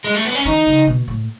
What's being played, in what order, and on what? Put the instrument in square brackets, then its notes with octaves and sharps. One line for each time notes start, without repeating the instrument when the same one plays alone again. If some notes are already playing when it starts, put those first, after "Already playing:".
[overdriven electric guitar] G#3
A3
B3
C#4
[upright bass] D#3 [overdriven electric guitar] D#4
[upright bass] C#3
B2
A2